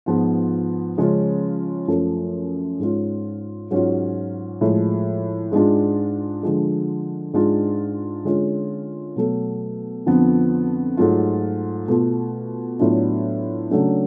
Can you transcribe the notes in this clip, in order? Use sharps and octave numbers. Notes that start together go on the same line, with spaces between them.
G#2 F3 B3 F4
C#3 F3 G#3 C#4 F4
F#2 F3 A3
G#2 G#3 C#4 F4
G#2 F#3 C#4 F4
A2 F3 G#3
G#2 G#3 D4 F4
D3 F3 G#3
G#2 G#3 D4 F4
D3 G#3 C#4 F4
B2 F#3 A3
F2 D3 F3 B3
G#2 F#3 A3 F4
B2 A3 F4
A2 F#3 B3 D4 F4
C#3 F#3 A3 D4